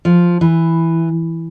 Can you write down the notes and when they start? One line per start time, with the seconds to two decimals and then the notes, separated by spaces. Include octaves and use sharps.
0.05 F3
0.41 E3